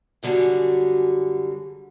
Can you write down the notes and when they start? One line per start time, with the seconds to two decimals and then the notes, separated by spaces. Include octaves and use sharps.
0.23 F#2 D3 G3 F#4 G#4